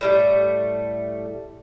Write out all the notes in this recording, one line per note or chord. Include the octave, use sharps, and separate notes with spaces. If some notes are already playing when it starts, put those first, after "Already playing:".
A2 G3 A3